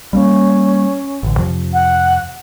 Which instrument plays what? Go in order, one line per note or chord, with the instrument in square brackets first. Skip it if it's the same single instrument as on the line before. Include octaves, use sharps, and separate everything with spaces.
[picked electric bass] G3 A3 A#3 [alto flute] C#4
[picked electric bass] A1 D3
F2 C3 F3
[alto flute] F#5